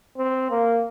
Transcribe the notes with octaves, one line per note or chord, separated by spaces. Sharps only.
C4
A#3